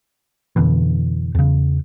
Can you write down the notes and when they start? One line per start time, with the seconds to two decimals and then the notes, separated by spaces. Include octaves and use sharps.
0.56 F2 B2 D3 E3
1.35 E2 C#3